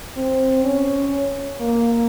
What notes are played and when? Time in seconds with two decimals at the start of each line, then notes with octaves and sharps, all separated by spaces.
0.17 C4
0.65 C#4
1.60 A#3